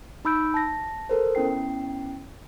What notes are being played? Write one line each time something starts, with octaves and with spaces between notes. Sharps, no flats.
D#4 B5 E6 G6 D7
A5 A#6
A4 A#4 C5
B3 C#4 E4 G5 C7